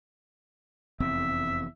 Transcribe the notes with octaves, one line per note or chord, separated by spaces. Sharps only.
F1 E2 C4 E5